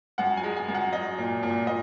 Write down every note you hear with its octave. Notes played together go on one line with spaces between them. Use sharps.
F#2 F#5
G#5
G#3
G#5
F#2
F#5
F#3 D#5
A#2
A#2
A#2 D#5